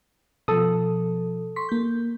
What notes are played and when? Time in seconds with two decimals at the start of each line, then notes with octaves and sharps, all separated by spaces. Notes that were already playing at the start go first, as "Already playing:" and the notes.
0.48 B2 F3 A4 D#6
1.56 C6 C#6 B6
1.69 A#3 G6